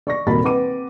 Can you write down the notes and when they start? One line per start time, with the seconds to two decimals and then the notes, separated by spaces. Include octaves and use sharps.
0.07 D5 C#6 A#6
0.27 D#1 C3 A#3 F#4 B5 A6
0.43 C4 B4 F#5 D6 D#7